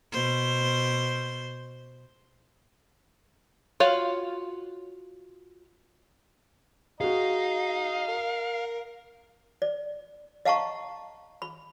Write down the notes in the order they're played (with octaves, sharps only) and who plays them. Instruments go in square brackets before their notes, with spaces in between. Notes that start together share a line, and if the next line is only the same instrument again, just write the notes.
[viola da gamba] B2 C5
[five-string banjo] F4 F#4 C#5 F5
[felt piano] F#4 G#4 [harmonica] D#5 A#5 [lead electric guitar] F5
[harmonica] A#4
[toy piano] D5
D#5 F5 F#5 A5 A#5 C#6
B5